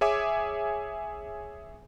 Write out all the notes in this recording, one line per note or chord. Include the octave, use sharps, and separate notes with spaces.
G#4 C#5 E5 G#5 D6